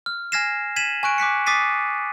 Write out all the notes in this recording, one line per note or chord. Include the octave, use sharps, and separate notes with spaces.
F6
G#5 F6 G#6 A#6 C7 E7
G#6 B6 D#7 E7 F#7
G#5 C#6 F#6 D7
D6 F#6 B6 C#7
D6 D#6 A6 B6 C7 D#7